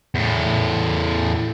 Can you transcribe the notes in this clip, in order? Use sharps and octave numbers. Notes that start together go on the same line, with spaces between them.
E2 A2